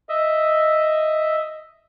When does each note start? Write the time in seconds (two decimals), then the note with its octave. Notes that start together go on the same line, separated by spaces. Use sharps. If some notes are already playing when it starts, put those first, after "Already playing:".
0.09 D#5 E5